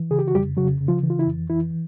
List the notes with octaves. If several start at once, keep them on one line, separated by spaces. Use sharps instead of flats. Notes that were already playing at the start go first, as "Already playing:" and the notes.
Already playing: E3
C#3 G#4
G4
F#4
F2 G3 G4
C#3 F#3 F#4
C#3
F3 F4
E3
F4
E4
F2
E3 E4